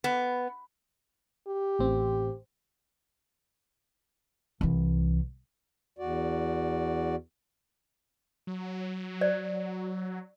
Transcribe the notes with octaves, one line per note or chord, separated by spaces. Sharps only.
B3
G4
A1 C4
C2 E3
E2 F#4 D5
F#3
C5 D5